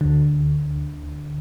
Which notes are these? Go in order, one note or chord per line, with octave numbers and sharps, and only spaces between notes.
D2 D3